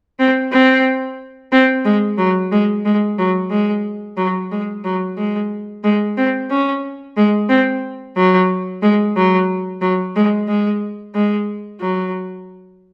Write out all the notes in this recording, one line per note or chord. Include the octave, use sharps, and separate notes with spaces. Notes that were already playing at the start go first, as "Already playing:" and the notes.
C4
C4
C4
G#3
F#3
G#3
G#3
F#3
G#3
F#3
G#3
F#3
G#3
G#3
C4
C#4
G#3
C4
F#3
G#3
F#3
F#3
G#3
G#3
G#3
F#3